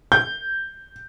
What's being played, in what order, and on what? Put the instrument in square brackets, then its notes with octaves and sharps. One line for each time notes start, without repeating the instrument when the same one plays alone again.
[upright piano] G6